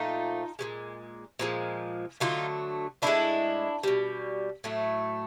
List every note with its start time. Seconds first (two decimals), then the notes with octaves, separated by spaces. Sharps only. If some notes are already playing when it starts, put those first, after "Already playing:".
Already playing: A#2 F3 A3 D#4 F4
0.59 A#2 F3 G#3
1.39 A#2 F3 G#3
2.20 D3 F#3 A3 D#4 F4
3.02 A2 E3 D4 E4
3.07 G#3
3.83 B2 G3
4.64 A2 F#3 A3